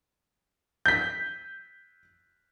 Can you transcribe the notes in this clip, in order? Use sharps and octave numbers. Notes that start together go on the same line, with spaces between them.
G6 B6